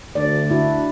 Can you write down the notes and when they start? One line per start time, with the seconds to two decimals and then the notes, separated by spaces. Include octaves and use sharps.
0.15 D2 D5
0.50 D4 E4 F#4